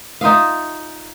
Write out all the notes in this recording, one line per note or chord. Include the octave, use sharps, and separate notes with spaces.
D#4 F4 E5 F5